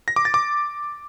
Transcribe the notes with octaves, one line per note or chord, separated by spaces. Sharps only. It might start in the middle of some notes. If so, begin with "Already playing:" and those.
A#6
D6
A6
D6